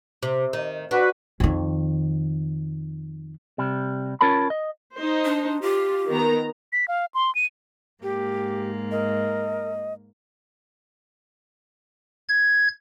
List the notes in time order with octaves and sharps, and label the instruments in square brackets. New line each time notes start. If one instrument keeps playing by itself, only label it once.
[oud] C3
D#3
[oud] D4 [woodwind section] F#4 B4
[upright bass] F2 D#3
[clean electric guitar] C3 G3
C#4 F4 A#4 C#5 A5 B5
D#5
[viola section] D#4 C5
[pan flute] D4
[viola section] F4 [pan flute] G4
[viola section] D#3 B3 A#5
[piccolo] B6
F5
C6
D#7
[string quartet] G#2 A#3 [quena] G4
[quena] A#4 [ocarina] D#5
[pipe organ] G#6